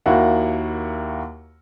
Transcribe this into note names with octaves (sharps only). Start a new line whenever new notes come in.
D#2 A#3 E4 F#4 F#5